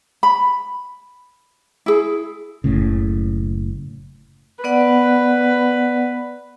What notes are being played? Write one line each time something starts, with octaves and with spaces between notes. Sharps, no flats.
B5
E4 G#4
F#1 A2 C#3
B3 B4 D5 F#5